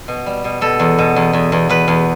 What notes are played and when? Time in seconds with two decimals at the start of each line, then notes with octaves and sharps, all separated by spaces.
0.08 B2
0.26 G3
0.44 B2
0.61 B2 A4
0.80 E2
0.98 B2
1.16 E2
1.33 E2
1.52 E2
1.69 E2 B4
1.88 E2